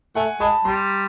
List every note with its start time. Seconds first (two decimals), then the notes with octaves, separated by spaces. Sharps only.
0.15 A3 F#5 G#5
0.40 G#3 A5 B5
0.65 G3 A#5 C6